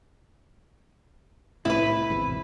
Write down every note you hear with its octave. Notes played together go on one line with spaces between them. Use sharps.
C2 A2 E4 B4
G#1 E2 C3